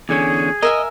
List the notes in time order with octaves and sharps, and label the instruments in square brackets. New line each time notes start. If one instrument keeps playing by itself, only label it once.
[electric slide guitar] E2 D3 C#4 [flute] G#4
[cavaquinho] A#4 E5 G#5 [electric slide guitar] D#5